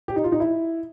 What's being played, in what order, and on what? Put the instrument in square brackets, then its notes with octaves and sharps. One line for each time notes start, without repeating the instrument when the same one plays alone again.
[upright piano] G4
D#4
F4
D#4
E4